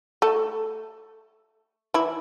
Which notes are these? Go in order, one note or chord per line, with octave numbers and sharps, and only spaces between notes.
A3 A4
E3 E4